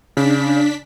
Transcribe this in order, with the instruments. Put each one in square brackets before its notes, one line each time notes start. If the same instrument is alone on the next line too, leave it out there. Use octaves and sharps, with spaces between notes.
[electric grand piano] C#3 [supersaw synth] D4 B6